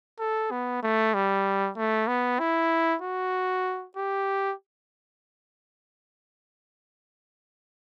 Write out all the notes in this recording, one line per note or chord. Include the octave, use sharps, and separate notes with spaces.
A4
B3
A3
G3
A3
B3
E4
F#4
G4